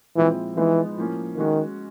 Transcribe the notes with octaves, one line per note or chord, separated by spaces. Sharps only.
A#2 E3 F3 G#3 C4 E4
E3 F3 G#3 B3 D#4
A2 F3 A#3 C#4
D#3 G#3 C#4 F#4